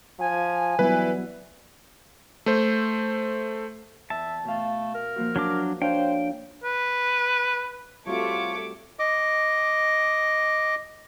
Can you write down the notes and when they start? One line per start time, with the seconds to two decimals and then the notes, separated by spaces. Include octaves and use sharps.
0.20 F3 G#5
0.79 E3 F#3 G3 B3 B4
2.46 A3 C5
4.10 E2 E5 A5
4.44 B2 A3 F5
4.95 A#4
5.16 F3 A#3 F#4
5.36 F#3 D4 D6
5.82 D4 C5 C#5 F5 G5
6.64 B4
8.07 G3 A3 C4 F4 F#4 C#5 D6
8.99 D#5 D6